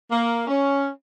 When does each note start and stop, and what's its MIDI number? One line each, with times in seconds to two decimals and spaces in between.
0.12 0.46 58
0.47 0.88 61